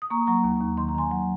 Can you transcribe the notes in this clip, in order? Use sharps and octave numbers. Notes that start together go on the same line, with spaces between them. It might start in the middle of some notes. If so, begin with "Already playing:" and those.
D#6
A#3 A#5 C#6
F#3 A#5 C#6
D#2
D#2
D#3 C6
A#5
D#3 G#5 C6
F#3